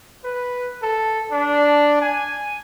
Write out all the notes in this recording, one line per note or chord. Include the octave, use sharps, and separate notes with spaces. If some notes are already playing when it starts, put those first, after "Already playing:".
B4
A4
D4
G#5